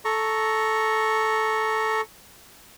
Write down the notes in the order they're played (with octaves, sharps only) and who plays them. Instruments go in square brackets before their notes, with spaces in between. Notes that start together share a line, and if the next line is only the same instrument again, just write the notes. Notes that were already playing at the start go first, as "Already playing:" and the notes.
[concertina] A4 A#5 C#6